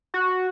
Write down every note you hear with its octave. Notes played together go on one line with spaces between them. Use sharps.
F#4